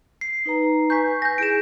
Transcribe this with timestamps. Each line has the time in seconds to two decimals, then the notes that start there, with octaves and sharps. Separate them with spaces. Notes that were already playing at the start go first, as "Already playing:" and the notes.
0.21 C7
0.45 D#4 B4 A#5
0.90 B4 G#5 C#6 G6 B6
1.22 G#5 G6 A#6
1.38 E4 G#4 D7 E7